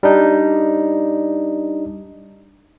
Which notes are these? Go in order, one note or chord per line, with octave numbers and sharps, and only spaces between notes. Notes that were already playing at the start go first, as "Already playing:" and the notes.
G3 D4 D#4